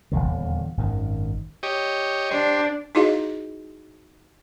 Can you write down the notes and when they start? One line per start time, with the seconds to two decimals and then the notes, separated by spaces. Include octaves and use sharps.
0.12 D#1 A1 E2 D3
0.77 G#1 F#2 D#3
1.63 G4 C#5 D#5
2.31 D4 G4 C5
2.95 D#4 E4 F#4 G#4 D#5 F5